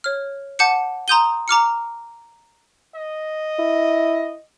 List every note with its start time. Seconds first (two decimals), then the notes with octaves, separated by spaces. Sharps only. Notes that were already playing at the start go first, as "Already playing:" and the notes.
0.04 C#5 F6
0.59 F#5 A5 D6 G6 C#7
1.08 A#5 C6 D#6 G6 D#7 G7
1.48 A#5 D6 F6 C#7
2.95 D#5
3.59 E4